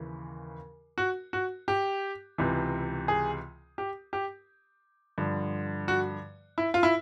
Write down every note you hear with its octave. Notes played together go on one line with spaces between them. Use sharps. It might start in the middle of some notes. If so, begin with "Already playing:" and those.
Already playing: D#2 C#3 E3
F#4
F#4
G4
C#2 C3 E3
G#4
G4
G4
G2 D3 F3
F#4
E4
F4
E4